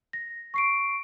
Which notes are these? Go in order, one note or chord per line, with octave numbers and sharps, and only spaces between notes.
A#6
C#6 C7 D7